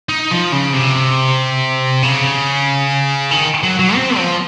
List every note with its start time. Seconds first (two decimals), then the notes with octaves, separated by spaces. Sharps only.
0.09 D#4
0.31 F3
0.52 C#3
0.73 C3
2.03 C#3
3.31 D#3
3.63 F#3
3.79 F#3
3.95 C4
4.17 F3